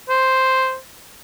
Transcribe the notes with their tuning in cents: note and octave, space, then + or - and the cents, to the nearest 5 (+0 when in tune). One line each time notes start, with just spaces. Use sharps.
C5 +0